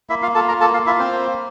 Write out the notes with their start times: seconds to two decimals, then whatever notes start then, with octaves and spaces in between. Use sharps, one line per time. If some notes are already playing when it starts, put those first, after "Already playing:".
0.10 A#3 E4 E5
0.22 F4 F5
0.35 F4 A4 A5
0.48 A#4 A#5
0.61 A#3 A4 A5
0.74 F4 F5
0.86 E4 F4 E5
0.99 C4 C5
1.12 A#3